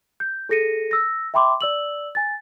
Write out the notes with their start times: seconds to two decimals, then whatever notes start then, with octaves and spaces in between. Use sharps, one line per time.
0.20 G6
0.49 G#4 A4 A#6 C#7 D#7
0.91 E6 A#6
1.34 E5 G5 B5 C6 D6
1.61 D5 E6 F#7
2.15 G#5 A6